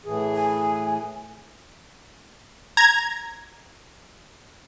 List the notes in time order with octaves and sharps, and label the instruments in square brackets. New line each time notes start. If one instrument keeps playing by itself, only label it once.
[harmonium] A2 E3 G#4
[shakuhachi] G#5
[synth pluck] A#5 G#6